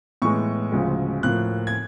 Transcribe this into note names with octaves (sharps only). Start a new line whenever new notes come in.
A2 E3 G#3 B3 C#6
D2 C#3 F3 G#3
A2 F3 A#3 F#6
G#6